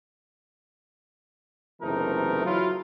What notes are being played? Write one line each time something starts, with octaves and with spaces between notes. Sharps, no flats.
F#1 C3 E3 A3 D#4 A#4
F#3 E4 F4